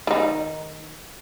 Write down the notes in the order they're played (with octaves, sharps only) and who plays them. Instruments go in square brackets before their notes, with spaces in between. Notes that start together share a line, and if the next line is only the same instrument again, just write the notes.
[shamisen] D#3 D#4